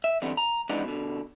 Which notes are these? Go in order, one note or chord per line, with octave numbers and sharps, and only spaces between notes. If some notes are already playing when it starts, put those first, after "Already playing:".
E5
D3 E3 G3 B3 C4
A#5
F2 E3 G#3 B3 D4 D#4
B2 D3